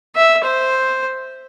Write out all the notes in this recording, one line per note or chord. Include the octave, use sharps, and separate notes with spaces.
E5
C5